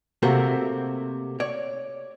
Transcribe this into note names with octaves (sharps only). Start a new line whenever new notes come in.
C3 A3 A#3 C4 F#4
C#5 D5